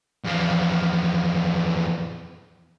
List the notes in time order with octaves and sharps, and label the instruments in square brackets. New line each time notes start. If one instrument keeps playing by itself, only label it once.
[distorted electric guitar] E2 F3